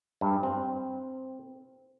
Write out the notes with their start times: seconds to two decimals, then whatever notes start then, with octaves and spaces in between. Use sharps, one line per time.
0.21 G2
0.43 C4